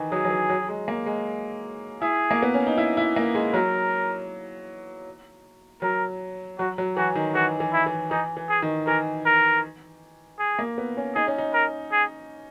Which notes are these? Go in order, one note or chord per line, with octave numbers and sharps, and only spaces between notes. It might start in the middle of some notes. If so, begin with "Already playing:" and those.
Already playing: D#3 E3
F#3 G#4
F#3
E3
F#3
G#3
A#3
G#3
E4 G#4
A#3
B3
C#4
D#4
E4
E4
A#3
G#3
F#3 A#4
F#3 A#4
F#3 F#4
F#3
E3 F#4
D#3
E3 F#4
E3
E4
E3
E3 D#4
E3
G#4
D#3
E3 A#4
A#4
G#4
A#3
B3
C#4
D#4 G#4
C#4
D#4
A#4
G#4